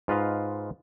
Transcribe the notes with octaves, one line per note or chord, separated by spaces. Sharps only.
G#2 F4 B4 D#5 F5